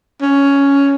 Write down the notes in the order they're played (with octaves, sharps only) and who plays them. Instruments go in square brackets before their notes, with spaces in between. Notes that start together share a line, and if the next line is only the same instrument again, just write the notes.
[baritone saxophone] C#4